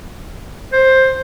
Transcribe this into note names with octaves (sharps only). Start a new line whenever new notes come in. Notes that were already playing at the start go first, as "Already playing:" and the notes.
C5